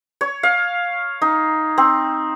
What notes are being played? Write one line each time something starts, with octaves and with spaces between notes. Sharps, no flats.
C#5
F5
D#4
C4